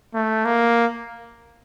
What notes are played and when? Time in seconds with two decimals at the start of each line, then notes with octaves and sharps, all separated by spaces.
0.14 A3
0.45 A#3